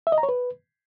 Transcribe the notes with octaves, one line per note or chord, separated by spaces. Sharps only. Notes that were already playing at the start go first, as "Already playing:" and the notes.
E5
D#5
A#5
C#5
B4